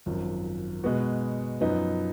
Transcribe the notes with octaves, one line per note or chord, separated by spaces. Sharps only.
G#1 F#2 F3
B2 G#3 B3 F#4
F#2 F3 B3 D#4